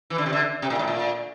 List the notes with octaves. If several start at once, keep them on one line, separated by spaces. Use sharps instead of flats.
E3
D3
C3
D3
C3
A#2
A2
A#2